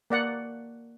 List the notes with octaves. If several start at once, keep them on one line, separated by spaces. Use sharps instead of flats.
A#3 D5 F#5